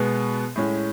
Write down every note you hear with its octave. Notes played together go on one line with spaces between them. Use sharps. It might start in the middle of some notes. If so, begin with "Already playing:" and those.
Already playing: B2 G#3 B3
A2 G#3 C#4